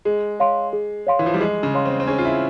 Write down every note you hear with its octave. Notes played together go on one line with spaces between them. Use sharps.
G#3 G#4
C#5 F5 C6
G#4
C#5 F5 C6
E3
F3
G3
G#3 G#4
C#3
C#5 F5 C6
C4
C4
C#4 G#4
F4
E4